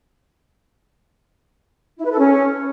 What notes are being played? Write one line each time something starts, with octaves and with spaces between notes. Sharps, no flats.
E4
B4
A4
C#4